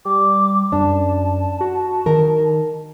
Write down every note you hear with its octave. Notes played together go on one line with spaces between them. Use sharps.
G3 D6
F#2 D4 A5
F#4
D#3 A#4